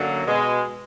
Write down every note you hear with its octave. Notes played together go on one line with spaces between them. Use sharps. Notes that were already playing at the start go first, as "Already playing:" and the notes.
Already playing: F#2 D3 F#3 A#3
B2 G#3